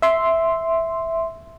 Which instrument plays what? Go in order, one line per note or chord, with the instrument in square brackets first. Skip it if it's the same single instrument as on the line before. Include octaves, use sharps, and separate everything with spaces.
[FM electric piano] E5 C6